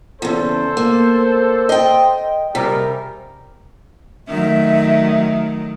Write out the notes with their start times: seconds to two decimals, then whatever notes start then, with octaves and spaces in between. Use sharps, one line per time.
0.22 E2 C#3 A4 C5
0.77 A#3
1.69 D#5 G5
2.55 C3 G3 G#4 A#4
4.28 D#3 F#3 A3 E5